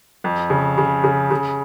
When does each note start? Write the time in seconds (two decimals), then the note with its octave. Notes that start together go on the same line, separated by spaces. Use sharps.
0.24 F2
0.50 C#3
0.78 C#3
1.04 C#3
1.31 C#3